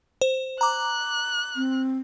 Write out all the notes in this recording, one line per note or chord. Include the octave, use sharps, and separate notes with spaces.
C5
A#5 D6 F#6
C4